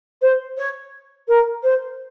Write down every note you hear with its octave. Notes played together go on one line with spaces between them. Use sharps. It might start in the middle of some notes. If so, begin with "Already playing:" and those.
C5
C#5
A#4
C5